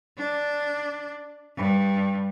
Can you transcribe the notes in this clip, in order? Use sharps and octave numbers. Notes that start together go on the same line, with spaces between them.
D4
G2